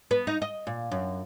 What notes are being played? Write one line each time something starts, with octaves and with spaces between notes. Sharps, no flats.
B3
D#4
D#5
A#2
F#2